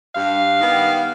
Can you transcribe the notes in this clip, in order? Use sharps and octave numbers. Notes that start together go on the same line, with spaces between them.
G2 F5
D#3 G3 B3